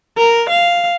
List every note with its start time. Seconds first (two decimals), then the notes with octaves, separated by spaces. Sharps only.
0.18 A#4
0.49 F5